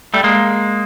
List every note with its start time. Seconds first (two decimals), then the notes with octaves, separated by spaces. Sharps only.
0.14 G3 A3
0.24 G#3 A#3